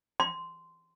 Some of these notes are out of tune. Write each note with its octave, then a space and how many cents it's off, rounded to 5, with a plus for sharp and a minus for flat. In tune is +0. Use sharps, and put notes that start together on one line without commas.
C6 -15